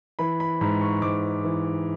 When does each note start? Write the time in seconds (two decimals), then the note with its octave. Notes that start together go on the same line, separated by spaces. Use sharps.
0.19 E3 B5
0.40 B5
0.61 G#2 B5
0.81 C#6
1.02 G#2 D6
1.44 E3